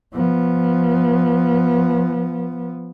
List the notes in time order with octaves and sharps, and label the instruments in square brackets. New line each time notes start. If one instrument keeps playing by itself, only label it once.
[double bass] F3 B3